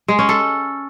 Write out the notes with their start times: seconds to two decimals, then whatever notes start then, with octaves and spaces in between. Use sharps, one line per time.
0.08 G#3
0.19 C#4
0.29 A4